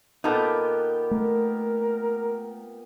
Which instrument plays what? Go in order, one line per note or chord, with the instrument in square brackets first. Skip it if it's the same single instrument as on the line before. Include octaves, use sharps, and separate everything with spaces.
[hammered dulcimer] A#2 B3 G4 [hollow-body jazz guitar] D#4 A4
[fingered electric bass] A3 [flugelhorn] A#4